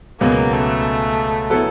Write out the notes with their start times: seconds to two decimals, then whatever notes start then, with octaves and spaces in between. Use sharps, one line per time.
0.20 C#2 B2 F#3 A#3 B3
0.53 A3
1.50 F#3 B3 E4 A4